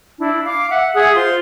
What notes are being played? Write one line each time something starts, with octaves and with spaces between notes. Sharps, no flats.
D4 E4
F5 D6
E5 F#5
G#4 E5 F#5 D#6
F4 C5 C6